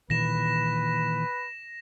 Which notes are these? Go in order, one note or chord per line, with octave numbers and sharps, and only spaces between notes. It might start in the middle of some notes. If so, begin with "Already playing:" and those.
A#2 D#3 E3 B4 A#6 E7